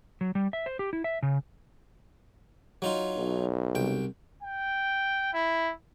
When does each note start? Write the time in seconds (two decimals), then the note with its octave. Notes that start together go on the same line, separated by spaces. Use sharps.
0.21 F#3
0.35 G3
0.53 E5
0.66 C5
0.79 G4
0.93 E4
1.04 E5
1.23 C#3
2.82 F#3 D#4 F4
3.17 B1
3.75 C2 G5
4.43 G5
5.34 E4